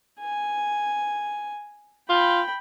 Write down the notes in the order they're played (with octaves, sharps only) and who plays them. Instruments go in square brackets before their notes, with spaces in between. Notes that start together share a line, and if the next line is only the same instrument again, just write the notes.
[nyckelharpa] G#5
[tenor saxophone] F4 [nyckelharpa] G5 B5